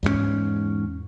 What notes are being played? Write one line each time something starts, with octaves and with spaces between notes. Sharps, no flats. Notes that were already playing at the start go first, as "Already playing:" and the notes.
E2 G#2 G3 C#4